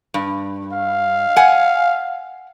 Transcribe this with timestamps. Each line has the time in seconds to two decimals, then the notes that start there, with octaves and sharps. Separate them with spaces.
0.14 G2
0.72 F5
1.36 F#5 G#5